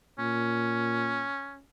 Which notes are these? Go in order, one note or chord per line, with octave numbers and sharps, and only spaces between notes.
A#2 C#4